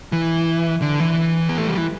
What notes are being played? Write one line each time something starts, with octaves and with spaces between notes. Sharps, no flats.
E3
D3
E3
B3
A3
G3
E3